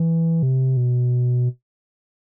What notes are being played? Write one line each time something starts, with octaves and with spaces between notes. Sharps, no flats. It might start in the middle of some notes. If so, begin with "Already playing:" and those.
Already playing: E3
C3
B2